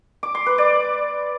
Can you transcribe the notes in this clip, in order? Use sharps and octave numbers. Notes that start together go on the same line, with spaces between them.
D6
C6
B4
D5